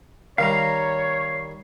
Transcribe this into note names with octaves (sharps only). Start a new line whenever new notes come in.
D#3 G3 C#5 F5 A#5